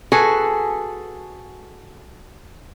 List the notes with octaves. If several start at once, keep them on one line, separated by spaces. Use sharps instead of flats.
F#4 G#4 A4 B4 G#5